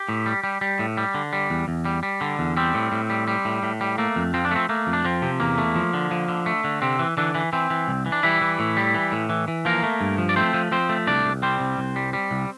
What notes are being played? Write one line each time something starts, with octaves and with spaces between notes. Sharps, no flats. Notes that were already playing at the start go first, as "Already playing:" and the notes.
Already playing: G4
A2
G3
G3
G3
A2
G3
D3
G3
E2
E2
G3
G3
D3
E2
G3 C4
A2
A2
G3
G3
A2
A2
G3
A3 A#3
F2
F3 C4
D4
A3 C4
A3 A#3
F2
D4
F3 C4
C3
E2 A#3
A3
F3
D3
F3
D3
A3
D3
C3 C4
E3
D3 E3 D4
E3
E3 C4
E3
C2
E3
D4
E3 G3 E4
E3
A2
G3
E3
A2
E3
E3
F3 A#3 A#4
A3
G2
F3
D5
A3 C4 C5
F3
F3 C4 C5
A3
C2 D4 D5
C2
G3 C4 C5
C2
C2
G3
G3
C2